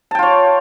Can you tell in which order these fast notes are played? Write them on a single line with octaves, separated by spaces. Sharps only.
A5 G5 F4 C#5